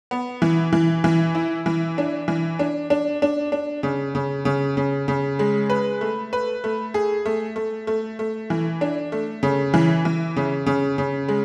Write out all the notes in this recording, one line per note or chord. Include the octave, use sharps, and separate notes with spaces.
B3
E3
E3
E3
E4
E3
D4
E3
D4
D4
D4
D4
C#3
C#3
C#3
C#3
C#3
G#3
B4
A3
B4
A3
G#4
A3
A3
A3
A3
E3
D4
A3
C#3
E3
E3
C#3
C#3
C#3
G#3